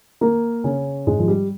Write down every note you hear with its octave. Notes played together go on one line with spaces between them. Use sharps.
A#3 A#4
C#3 C#4
G#2 G#3
F3
G3